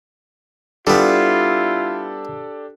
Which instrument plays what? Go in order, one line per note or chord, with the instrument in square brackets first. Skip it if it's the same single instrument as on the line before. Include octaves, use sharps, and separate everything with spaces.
[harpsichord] G3 B3 [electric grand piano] D4 G4 A4 [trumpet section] E4 F4